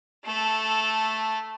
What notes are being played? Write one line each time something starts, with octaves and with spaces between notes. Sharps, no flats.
A3 A4